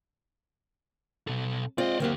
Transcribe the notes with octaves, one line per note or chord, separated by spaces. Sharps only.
B2 A4
G#3 C4 F4 D5 D#5
D2 F#3 A#3 C4 G4